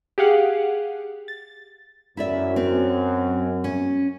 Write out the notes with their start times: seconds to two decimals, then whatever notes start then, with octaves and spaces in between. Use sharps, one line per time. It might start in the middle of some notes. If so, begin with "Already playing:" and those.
0.18 G4 G#4 F5 F#5 F#6
1.28 A6
2.17 F#2 E4 D5 E5
2.56 C4
3.64 C#4